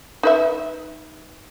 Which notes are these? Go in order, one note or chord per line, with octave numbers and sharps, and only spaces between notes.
D#4 B4 E5